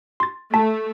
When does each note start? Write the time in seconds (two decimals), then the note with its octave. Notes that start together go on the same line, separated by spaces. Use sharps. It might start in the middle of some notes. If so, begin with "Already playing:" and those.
0.20 C6 A6
0.54 A3 A5 B6